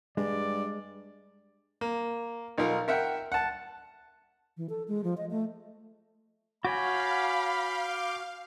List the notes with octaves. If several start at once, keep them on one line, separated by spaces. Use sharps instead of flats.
G2 G#3 D5
A#3
B1 D#4 F4 A#4
A#4 E5 F#5 G5
F#5 A5
E3
A4
G#3
F3
D#5
A3
F#4 C#5 F5 G#5 B5 D6 G6